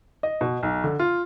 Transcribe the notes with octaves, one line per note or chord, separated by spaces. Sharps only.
D#5
B2
B1
D3
F4